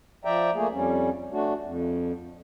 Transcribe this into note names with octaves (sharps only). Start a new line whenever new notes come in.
F3 D5 E5 G5 A#5
A3 A#3 G#4
F2 G3 C#4
A3 D4 F#4
F2